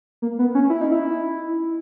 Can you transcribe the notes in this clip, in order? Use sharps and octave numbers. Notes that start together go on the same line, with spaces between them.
A#3
B3
C#4
E4
D#4
E4